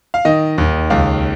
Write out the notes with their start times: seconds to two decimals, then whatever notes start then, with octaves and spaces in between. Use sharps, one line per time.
0.14 F5
0.25 D#3 D#5
0.58 D#2
0.90 C#2 F5